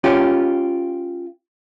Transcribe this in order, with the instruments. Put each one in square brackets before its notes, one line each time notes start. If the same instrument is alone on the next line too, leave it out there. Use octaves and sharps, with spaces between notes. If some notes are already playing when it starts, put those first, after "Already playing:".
[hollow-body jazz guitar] C#4 F4 G4